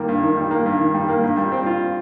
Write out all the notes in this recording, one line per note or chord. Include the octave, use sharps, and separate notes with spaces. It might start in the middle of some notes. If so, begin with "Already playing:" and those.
Already playing: D#3 G3 A#3
G2
D#3
G3
A#3
G2
D#3
G3
A#3
G2
G3
C4
F4